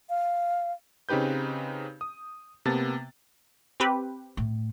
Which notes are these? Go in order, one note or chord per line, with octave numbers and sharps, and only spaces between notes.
F5
C#3 C4 D#4 G4 B4 G6
D#6
C3 A#3 B3 A5 A6
C4 G4 B4
A2